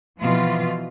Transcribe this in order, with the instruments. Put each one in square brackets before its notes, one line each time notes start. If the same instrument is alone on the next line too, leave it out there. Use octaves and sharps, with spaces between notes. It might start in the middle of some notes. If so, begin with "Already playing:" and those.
[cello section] B2 E3 F3 F4